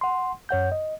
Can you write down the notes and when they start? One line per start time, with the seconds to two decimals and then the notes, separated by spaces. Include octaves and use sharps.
0.01 F#5 C6
0.49 F#2 C#5 F#5 G6
0.72 D#5